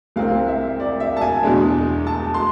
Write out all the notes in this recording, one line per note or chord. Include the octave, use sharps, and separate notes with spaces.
C2 C3 G#3 C4 F5
E5
D5
E5
A5
G#5
E2 B2 G#3 D4
A5
C6